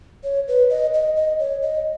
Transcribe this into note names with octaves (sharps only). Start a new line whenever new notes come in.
C#5
B4
D#5
D#5
D#5
C#5
D#5